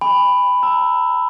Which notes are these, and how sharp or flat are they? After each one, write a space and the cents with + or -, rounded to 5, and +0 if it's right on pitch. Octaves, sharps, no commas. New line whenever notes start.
G#5 -40 B5 +10
A#5 -25 E6 +0